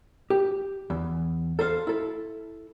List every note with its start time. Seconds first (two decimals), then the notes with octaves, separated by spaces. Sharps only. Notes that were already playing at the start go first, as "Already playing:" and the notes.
0.30 G4
0.90 E2
1.59 A4 C5 E5 F5
1.87 E4 A4